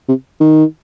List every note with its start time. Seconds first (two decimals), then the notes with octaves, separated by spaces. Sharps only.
0.09 C3
0.40 D#3